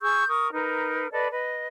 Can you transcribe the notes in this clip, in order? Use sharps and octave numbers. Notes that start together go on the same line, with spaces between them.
G#4 C#6 E6 G6
A#4 C#6 D#6
D#4 A#4 B4
A4 B4 D5 D#5
B4 D#5